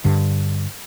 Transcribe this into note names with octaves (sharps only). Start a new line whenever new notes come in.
G2 D3